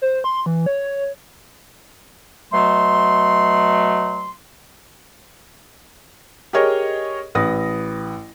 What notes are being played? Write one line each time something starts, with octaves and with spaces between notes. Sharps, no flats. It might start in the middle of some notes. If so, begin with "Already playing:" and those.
C5
C6
E3
C#5
B2 F#3 A3 C6
G4 G#4 A#4 C#5 D#5
A1 B4 D#6 A#6